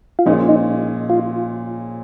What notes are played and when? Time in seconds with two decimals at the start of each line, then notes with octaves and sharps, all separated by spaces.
0.19 F4
0.26 A#2 F3 G#3 C#4 D#4
0.49 D#4
1.10 F4